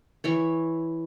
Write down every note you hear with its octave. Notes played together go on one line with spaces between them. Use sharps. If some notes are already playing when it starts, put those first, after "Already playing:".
E3 E4 C#5